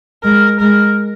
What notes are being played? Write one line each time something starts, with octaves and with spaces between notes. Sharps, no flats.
G#3 A#4
G#3 A#4